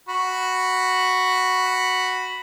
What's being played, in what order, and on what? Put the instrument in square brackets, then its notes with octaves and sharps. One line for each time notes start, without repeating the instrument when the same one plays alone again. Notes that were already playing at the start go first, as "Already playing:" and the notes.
[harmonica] F#4 B5